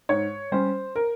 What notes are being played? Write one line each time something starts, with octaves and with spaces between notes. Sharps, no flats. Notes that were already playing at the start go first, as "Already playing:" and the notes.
G#2 C#5
G3 C#4 C5
A#4